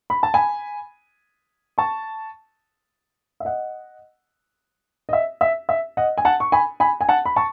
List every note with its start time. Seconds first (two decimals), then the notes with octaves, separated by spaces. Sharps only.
0.10 B5
0.23 A5
0.34 G#5 B5
1.78 A5 C#6
3.40 E5
3.45 D#5 F#5
5.09 D#5
5.13 E5
5.41 E5
5.69 E5
5.97 D#5 F#5
6.18 G#5
6.25 F#5 A5
6.40 C#6
6.52 G#5 B5
6.80 G#5 B5
7.01 G#5
7.09 F#5 A5
7.26 B5
7.36 A5 C#6